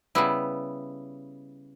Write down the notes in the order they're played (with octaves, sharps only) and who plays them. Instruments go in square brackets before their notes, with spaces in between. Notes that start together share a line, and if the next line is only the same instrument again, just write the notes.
[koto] C#3 G3 B3 E4